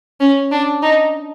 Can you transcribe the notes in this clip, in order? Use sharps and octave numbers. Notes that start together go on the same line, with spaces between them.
C#4
D4
D#4